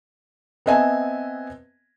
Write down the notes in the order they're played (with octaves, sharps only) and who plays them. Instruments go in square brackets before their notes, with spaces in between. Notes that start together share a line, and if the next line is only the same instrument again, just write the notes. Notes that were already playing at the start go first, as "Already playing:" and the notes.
[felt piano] B3 C4 D#5 E5 G#5 A5